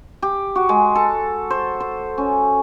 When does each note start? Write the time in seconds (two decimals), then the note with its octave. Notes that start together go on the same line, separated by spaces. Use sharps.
0.22 G4
0.55 F#4
0.69 G#3
0.95 A4
1.50 C5
1.80 C5
2.18 C#4